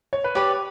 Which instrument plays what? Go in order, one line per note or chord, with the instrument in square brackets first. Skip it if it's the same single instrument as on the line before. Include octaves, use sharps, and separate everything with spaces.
[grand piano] C#5
B4
[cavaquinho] G4 B4 D5 [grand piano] C#5